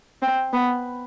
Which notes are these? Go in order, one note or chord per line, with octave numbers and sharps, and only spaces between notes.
C4
B3